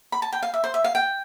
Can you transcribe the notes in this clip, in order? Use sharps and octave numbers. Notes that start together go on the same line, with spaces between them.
B5
A5
G5
F5
E5
C5
E5
F5
G5